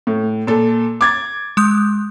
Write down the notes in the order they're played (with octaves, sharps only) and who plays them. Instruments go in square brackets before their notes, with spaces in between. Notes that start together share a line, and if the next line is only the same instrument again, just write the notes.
[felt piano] A2
A#2 A4
D6 G#6 A6
[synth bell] G#3 D#6 G6